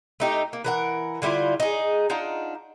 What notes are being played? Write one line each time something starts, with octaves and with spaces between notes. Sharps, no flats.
A3 D#4 G4
A#3
E3 A#4 F#5
D3 G3 E4 F4
D#4 G#4
D4 D#4 F4 F#5